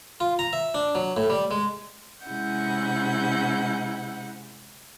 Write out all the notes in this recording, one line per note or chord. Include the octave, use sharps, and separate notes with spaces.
F4
A#5
E5
D4
F#3
A2
G3
G#3
C3 G#3 C#4 E4 F#5 G6